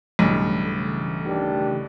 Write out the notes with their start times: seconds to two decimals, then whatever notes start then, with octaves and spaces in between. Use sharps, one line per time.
0.19 B1 G2 C#3 E3 A3
1.25 D#3 D4 G4